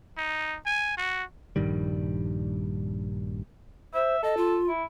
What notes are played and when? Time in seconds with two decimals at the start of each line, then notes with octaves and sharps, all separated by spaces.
0.17 D#4
0.66 G#5
0.97 F#4
1.56 A#1 G2 D#3 G3
3.94 C5 E5
4.23 A4 D#5
4.37 F4
4.68 E4